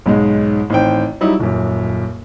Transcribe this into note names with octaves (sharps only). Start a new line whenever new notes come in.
B1 G#2 G#3
A1 D#3 C4 G5
F#3 G3 D#4 E4
D#1 F#2